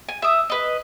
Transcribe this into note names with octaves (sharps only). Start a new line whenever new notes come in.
G#5
E5 D#6
B4 D#5